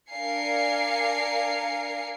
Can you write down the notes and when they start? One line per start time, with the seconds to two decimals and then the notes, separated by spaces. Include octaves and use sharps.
0.11 D4 A#4 F5 G#5 C7 C#7